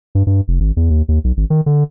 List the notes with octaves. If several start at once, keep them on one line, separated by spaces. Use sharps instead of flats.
G2
G2
F1
G#1
E2
D#2
D#2
B1
G#1
D#3
D3